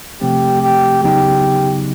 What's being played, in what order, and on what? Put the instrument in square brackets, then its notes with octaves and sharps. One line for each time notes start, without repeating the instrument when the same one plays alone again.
[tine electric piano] C3 F3 A3 C4 [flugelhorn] G4
[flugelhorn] G4
[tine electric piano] C#3 F#3 B3 D#4 [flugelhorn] G4